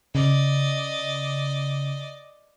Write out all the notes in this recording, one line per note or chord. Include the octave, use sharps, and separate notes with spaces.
C#3 D5 D#5